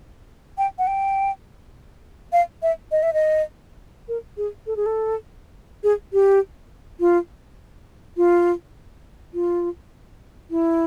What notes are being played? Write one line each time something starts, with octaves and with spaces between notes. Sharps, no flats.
G5
F#5
G5
F5
E5
D#5
E5
D#5
A#4
G#4
A4
G#4
A4
G#4
G4
F4
F4
F4
E4